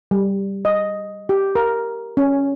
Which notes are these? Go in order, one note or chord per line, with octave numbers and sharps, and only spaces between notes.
G3
D#5
G4
A#4
C#4